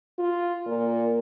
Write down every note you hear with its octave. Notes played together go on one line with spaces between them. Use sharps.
F4
A#2